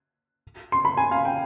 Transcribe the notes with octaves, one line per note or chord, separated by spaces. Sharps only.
C6
B5
G#5
F5
G5